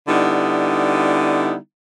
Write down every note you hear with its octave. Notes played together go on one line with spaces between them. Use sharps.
D3 G3 B3 D#4 E4